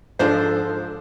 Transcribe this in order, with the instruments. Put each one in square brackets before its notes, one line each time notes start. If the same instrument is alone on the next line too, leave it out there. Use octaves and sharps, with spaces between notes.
[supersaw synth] G#2 F3 [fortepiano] D4 C5 [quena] A4